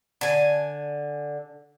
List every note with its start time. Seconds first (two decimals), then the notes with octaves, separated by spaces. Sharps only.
0.21 D3 G#5